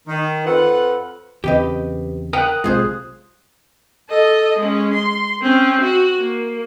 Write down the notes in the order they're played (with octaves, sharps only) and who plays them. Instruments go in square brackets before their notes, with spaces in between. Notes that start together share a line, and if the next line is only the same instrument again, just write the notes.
[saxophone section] D#3
F2 F4 A4 B4 F#5
[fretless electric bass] E2 C#3 C4 [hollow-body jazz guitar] G4 B4 D#5
[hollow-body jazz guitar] A#4 F#5 G5 [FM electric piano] D#6 F#6
[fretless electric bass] B1 C3 G#3 [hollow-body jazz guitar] F4 G#4 C5
[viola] A4 D#5
G#3 C#4
C6
C4 C#4
F#4
A#3